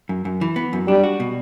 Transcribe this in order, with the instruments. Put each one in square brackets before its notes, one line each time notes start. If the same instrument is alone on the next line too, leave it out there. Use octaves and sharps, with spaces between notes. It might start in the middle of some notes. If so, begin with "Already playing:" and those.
[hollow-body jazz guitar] F#2
F#2
E3
B3
F#2
[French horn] G3 [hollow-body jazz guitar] D4
[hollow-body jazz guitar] F#4
B2